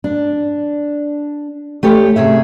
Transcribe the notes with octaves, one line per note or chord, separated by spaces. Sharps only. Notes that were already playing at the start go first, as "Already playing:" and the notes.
D4
A3 G4 A4 C#5
C3 C#4 G#4 E5